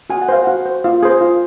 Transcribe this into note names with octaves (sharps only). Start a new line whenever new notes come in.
F#4 G#5
F#5
C5 F5
F#4 F#5
C5
F4 F5
G#4 C5
F4